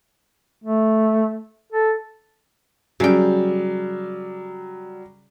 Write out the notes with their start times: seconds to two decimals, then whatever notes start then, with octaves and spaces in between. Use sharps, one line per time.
0.64 A3
1.72 A4
3.00 C#3 F#3 G3 G5